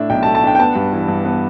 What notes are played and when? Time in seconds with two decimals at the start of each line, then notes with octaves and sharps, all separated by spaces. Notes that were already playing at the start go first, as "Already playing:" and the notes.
Already playing: A2 A3 D4 E5
0.10 B1 G5
0.23 A5
0.26 A3
0.35 A5
0.43 D4 G5
0.55 G5
0.59 B3 A5
0.75 G2
0.93 E3
1.08 G2
1.25 B3